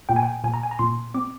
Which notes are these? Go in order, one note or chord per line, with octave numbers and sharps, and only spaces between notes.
A#2 G5
G#5
G5
A#2 G#5
A#5
G#5
A#5
A#2 C6
C4 D6